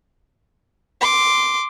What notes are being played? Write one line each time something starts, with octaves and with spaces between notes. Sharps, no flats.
C6 D6